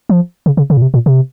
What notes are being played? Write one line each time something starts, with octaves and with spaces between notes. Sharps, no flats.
F3
C#3
C#3
C#3
A#2
C3
A#2
C3